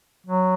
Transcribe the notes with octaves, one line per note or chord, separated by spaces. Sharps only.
F#3